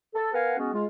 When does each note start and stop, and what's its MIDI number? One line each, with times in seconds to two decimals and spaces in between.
0.14 0.29 69
0.33 0.56 59
0.33 0.56 70
0.33 0.56 71
0.33 0.56 77
0.33 0.56 78
0.33 0.56 80
0.58 0.73 56
0.58 0.73 59
0.58 0.73 61
0.58 0.73 66
0.73 0.85 56
0.73 0.85 65